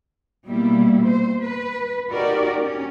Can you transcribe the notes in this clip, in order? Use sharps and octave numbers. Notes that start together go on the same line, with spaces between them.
B2 G3 A#3 E4
C5
B4
D#4 F#4 G4 A#4 D5
C#4